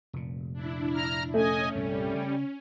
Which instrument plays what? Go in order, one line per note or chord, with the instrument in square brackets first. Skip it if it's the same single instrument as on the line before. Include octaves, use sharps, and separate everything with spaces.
[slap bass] F1 A#2
[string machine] D4 E4
[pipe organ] A#5 F6
[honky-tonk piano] A3 [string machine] C#4 [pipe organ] D#5 G#5
[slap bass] C2 G2 A#2 [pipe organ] G3
[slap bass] C#3